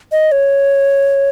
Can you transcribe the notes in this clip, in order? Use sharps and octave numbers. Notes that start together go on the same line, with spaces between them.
D#5
C#5